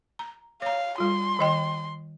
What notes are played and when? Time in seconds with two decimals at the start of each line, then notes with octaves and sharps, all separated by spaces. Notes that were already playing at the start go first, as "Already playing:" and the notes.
0.19 A#5
0.62 C#5 F5 A#5
0.98 G3 F4 C6
1.39 D#3 D#5 G5